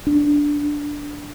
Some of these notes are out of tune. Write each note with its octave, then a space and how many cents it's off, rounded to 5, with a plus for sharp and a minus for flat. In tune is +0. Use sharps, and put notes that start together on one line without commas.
D4 -5